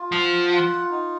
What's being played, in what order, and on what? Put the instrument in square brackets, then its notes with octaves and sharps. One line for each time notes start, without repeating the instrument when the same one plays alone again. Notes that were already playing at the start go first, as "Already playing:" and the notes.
Already playing: [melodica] F4
[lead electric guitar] F3 [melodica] F#5
[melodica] F4
D#4